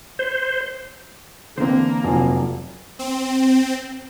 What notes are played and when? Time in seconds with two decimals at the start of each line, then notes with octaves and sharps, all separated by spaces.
0.19 C5
1.58 D3 E3 A#3 C4 C5
2.04 F1 F#3 F4
2.99 C4